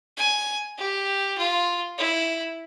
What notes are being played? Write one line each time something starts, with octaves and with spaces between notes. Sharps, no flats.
G#5
G4
F4
E4